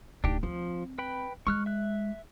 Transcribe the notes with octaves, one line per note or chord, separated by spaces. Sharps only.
D1 D4 D#4 G4
F3 C4
B4 G5 B5
G#3 C#6 F6 F#6
E5 F#6